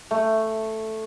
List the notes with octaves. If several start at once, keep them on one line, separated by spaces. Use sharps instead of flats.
A3